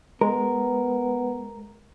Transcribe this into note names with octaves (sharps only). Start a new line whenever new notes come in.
G#3 B3 A#4